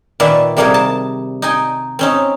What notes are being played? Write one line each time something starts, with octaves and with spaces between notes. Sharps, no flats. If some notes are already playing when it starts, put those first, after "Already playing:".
A#2 D#3 B4 D5 E5
C3 G3 A#3 D#4 G#4 A#4
A5
D#4 G5 G#5
C4 C#4 D#4